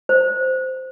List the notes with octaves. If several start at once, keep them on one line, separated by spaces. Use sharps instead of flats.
C5